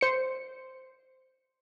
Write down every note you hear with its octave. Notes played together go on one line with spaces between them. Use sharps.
C5 C#7